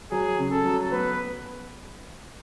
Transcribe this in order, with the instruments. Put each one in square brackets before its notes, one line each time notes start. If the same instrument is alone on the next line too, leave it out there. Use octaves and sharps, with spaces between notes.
[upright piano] F#3 [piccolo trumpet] G#4
[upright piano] C#3
[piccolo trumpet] A4
[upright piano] F#3
[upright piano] B3 [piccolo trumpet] B4